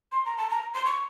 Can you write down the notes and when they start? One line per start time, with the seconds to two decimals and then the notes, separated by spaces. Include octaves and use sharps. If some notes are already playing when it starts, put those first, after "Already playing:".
0.12 C6
0.25 A#5
0.37 A5
0.50 A#5
0.74 C6
0.85 C#6